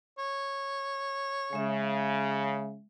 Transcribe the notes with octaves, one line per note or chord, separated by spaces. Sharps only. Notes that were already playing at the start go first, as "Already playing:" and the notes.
C#5
C#3 G#3 E5